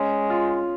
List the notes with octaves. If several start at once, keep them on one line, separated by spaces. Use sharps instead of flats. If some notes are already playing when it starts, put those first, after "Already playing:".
Already playing: G#3 C#4
F4